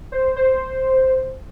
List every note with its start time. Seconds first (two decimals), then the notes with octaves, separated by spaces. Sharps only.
0.12 C5
0.36 C5